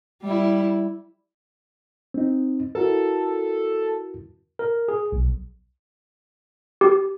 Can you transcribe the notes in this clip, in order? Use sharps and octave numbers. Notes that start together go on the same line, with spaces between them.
G3 E4
C4 D#4
E4 F#4 A4 A#4
A#4
G#4
B1
G4